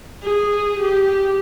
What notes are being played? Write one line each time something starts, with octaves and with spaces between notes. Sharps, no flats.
G#4
G4